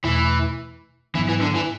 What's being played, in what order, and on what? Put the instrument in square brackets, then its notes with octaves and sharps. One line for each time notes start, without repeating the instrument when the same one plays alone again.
[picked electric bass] E2 B2 A3 [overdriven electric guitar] E3
[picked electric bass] G#2 F#3 B3 D4 [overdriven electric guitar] E3
[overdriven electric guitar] E3
D3
E3